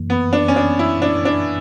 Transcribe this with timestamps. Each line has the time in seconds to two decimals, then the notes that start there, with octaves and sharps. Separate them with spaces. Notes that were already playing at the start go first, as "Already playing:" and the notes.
Already playing: F#2 E3 A#3
0.10 B3
0.33 D4
0.48 C#4
0.56 D4
0.79 E4
1.02 D4
1.25 D4